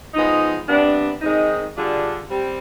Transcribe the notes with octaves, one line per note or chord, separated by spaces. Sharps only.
F3 G#3 B3 D#4
C3 G3 B3 D4
D#3 G#3 C4 D#4
D3 G3 D4 F4 G#4
G3 C4 G4